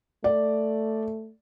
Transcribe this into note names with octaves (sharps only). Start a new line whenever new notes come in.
A3 D5